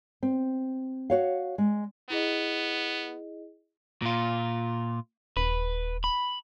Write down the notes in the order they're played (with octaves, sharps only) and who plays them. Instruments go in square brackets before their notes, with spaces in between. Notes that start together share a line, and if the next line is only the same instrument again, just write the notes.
[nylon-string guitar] C4
F#4 C#5 F5
G#3
[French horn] B3 [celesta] E4 G#4 D#5
[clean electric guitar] A#2 F4
[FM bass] D#1 [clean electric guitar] B4
[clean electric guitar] B5